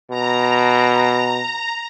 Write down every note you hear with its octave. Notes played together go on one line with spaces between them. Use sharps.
B2 A#5